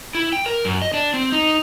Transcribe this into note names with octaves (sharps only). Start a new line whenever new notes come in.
E4
G5
A#4
F#2
D#5
D4
C4
D#4